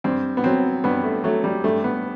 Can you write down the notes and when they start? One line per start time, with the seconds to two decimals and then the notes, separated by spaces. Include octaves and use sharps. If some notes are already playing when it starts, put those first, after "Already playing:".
0.04 G2 C4
0.37 B3
0.44 F#3 C4
0.84 G2 B3
1.04 A3
1.24 F#3 A3
1.44 G3
1.64 G2 A3
1.84 B3